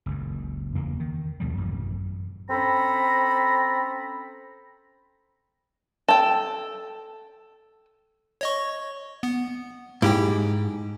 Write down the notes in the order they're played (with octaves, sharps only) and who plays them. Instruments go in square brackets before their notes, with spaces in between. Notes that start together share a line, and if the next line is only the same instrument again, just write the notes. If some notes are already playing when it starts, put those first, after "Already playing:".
[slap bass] F#1 C#2 F#2
E2 C#3 A#3
D#3
D#2 B2 F3 G3
A1 F#2
[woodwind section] C4 C#4 A4 A#5 B5
[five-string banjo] A4 G5
[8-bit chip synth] C#5 D#5 C#6
B3
[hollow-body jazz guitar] G#2 [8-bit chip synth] E4 G4 G5